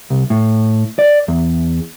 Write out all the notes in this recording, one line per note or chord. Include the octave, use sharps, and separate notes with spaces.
C2
A2
D5
E2